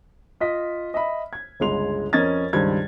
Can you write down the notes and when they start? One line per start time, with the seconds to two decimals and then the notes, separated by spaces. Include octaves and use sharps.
0.40 F4 D#5 B6
0.94 D#5 E5 B5
1.33 G#6
1.60 G1 C#2 G#3 C6 F7
2.13 F2 C#4 A#4 D#5 G#6 A6
2.53 C#2 G2 D#3 C5 G#6